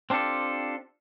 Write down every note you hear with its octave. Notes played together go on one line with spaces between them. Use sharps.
C4 D4 F4 G4 A4